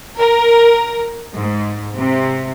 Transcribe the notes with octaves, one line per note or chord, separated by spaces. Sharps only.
A#4
G#2
C3